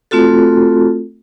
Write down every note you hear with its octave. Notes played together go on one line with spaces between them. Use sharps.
A3 C4 F4 F#4 A4